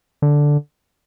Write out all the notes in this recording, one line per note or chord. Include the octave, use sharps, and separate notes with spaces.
D3